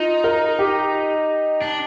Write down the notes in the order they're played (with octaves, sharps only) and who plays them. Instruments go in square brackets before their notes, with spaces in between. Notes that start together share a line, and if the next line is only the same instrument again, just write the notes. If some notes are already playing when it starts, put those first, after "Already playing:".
Already playing: [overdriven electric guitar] D#4 [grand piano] F4
[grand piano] A#4
G4
[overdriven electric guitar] D4